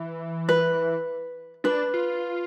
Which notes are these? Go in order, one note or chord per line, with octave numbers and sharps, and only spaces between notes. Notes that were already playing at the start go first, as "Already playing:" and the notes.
Already playing: E3
B4
D4 B4
F4